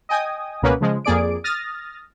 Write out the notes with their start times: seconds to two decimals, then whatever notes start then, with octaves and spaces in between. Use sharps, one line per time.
0.09 D#5 G5 G#5 D#6
0.62 C#2 B2 A#3 B3 C#4 B4
0.81 C#3 F3 G#3
1.05 F2 A#3 G#4 D5 D7
1.44 D#6 F6 A6 A#6